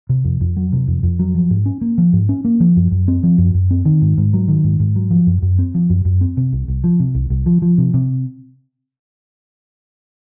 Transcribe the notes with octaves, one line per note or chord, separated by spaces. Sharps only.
C3
F2
F2
F#3
C3
F2
F2
F#3
F3
G#2
C#4
A#3
F3
G#2
C#4
A#3
F3
F#2
F#2
C4
F3
F#2
F#2
C4
D#3
G#2
G#2
F#3
D#3
G#2
G#2
F#3
F3
F#2
F#2
C4
F3
F#2
F#2
C4
C3
C2
C2
F3
C3
C2
C2
F3
F3
C3
C3